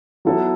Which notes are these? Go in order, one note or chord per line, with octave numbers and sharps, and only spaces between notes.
F#3 B3 E4 A4